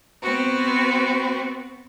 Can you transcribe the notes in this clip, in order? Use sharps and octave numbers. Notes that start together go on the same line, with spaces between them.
B3 C4 F#4